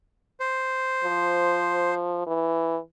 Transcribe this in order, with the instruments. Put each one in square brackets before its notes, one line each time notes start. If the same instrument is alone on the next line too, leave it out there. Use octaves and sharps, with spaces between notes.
[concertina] C5
[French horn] F3
E3